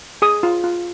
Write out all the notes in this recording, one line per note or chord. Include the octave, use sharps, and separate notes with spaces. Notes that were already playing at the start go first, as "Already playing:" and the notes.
G#4 D#6
F4
F4